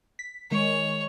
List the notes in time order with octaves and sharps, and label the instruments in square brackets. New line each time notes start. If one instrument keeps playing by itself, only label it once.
[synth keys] B6
[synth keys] D#3 G#3 [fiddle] C#5